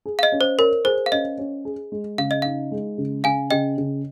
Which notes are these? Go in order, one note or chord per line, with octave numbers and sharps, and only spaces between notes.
G#4
F5
D#5
C#4
C5
A#4 C#5
G#4 C5
F5
C#4 D#5
C#4
G#4
G#3
C#3 F5
D#5
D#4 F5
G#3
C#3
C#3 F5 G#5
C#3 D#5 G5
C#3